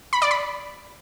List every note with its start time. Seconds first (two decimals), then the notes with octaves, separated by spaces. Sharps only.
0.13 B5
0.22 D5
0.31 B5